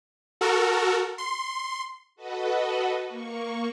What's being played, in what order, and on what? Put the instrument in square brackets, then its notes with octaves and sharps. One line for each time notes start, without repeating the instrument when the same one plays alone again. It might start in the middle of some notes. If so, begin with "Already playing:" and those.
[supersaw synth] F#4 A4 A#4
C6
[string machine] F#4 A4 B4 D#5 F#5
A#3 C#6